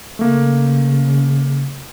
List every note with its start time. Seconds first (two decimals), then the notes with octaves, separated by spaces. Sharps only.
0.19 C#3 A3 A#3